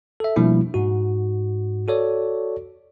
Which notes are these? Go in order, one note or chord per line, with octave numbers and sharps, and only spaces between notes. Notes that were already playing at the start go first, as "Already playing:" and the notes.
A4 E5
B2 F3 G3 A#3 D4 E4
G#2 F#4
F#4 A4 C#5 D5